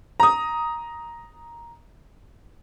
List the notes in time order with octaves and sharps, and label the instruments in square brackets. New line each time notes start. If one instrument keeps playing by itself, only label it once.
[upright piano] A#5 D#6